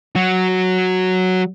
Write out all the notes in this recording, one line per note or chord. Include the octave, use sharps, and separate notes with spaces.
F#3 F#4